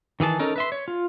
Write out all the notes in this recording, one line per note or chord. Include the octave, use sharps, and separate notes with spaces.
D#3 E3 G#4 A5
C#4 D#4 A4 A#4
B4 E5 C6
C#5
F4